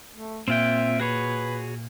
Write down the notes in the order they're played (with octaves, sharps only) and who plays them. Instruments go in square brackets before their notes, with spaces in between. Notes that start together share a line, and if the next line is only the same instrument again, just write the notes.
[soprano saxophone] A3
[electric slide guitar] A#2 [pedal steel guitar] C4 F4 G5 [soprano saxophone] E5
[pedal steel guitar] F#4 G#4 C#5 [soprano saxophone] B4